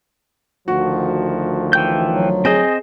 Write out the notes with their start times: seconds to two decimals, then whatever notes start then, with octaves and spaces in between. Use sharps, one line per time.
0.68 D2 D#3 F3 F#4
1.73 E3 G5 G6
2.09 F#3
2.45 C4 G#4 C5 D#5